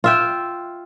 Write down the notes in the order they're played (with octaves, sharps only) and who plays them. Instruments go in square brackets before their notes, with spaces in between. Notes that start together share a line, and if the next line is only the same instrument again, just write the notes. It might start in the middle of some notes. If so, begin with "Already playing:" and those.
[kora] F4 E5 G5